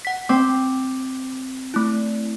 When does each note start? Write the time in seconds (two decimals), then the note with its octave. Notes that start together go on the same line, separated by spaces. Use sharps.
0.05 F#5 B6
0.29 C4 D6
1.74 A3 E4